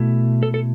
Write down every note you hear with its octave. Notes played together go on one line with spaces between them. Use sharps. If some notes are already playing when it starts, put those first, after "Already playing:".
Already playing: B2 A3 E4
A4
A4